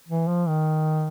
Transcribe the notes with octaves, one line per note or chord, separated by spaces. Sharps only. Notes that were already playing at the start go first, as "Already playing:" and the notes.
E3
F3
D#3